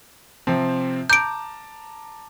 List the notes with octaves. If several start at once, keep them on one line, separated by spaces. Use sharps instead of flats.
C3 F3 C4
A5 A#5 D6 G6 D7